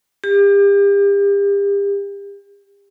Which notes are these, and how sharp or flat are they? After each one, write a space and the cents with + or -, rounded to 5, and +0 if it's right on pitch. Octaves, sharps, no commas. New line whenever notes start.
G4 +35